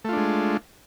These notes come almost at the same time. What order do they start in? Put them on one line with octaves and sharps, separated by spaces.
A3 F4 D4 G#3